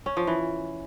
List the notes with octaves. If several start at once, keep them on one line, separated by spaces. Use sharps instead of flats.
C#4
F3
E3